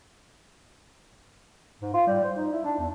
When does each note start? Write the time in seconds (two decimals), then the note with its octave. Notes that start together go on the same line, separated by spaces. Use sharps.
1.81 G#2
1.94 F4
2.07 G3
2.23 C5
2.36 D#4
2.52 E4
2.64 D4
2.78 E2